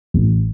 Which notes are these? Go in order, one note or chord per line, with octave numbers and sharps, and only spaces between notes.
A1